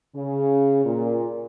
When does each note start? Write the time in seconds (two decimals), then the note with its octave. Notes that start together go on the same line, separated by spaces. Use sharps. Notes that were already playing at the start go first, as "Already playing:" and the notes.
0.14 C#3
0.84 A#2